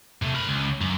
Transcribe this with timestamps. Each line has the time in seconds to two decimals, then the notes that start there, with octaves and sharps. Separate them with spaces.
0.22 C3 A3
0.35 A#4 B5
0.47 C#2
0.81 F#2